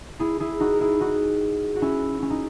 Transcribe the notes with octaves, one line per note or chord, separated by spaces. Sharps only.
E4 G#4
E4 G#4
D#4 F#4
A#4
E4 G#4
D#4 F#4
F#4
C#4 E4
C#4
D#4